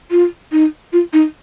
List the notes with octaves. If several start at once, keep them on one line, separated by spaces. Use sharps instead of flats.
F4
D#4
F4
D#4